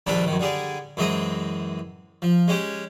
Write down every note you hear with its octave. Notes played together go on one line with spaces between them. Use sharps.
A#1 D#2 G3 D4 B4 A5
F#2 D#3
D3 G3 G#4 D5
F#2 E3 G#3 C4 D#5 D#6
F3
G#3 C#4 G4